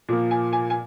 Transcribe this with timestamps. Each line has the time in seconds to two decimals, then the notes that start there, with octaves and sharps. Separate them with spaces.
0.09 A#2 F3 A#3
0.31 G#5
0.53 G#5
0.70 G#5